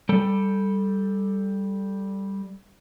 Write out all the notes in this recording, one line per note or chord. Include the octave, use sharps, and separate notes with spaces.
G3 A4